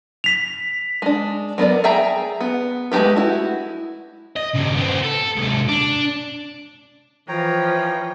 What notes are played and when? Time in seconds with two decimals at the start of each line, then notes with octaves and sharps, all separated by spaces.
0.24 B6 F7
1.02 G#3 D4
1.58 F#3 B3 A#4 D5
1.84 G#4 E5 G5 A#5
2.40 B3
2.92 G#3 A3 C4 G4 B4
3.16 E4 F#4
4.36 D#5
4.54 G2 C#3
4.76 B3 C4
5.03 A4
5.36 G#2 C3
5.68 D4
7.28 E3 F3 C#5 G5 A#5